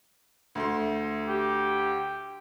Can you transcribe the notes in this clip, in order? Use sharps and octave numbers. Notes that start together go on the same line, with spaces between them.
D2 A3 C6
G4